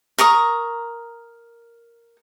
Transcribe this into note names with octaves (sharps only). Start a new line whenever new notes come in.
A#4 A#5 C#6 D#6